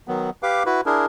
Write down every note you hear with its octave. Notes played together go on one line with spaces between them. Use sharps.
D#3 F#3 B3
G4 B4 F5 D6
E4 F#4 B4
D4 E4 G#4 A#4